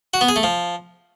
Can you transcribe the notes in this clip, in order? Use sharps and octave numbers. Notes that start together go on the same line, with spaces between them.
F#4
B3
G#4
A3
F3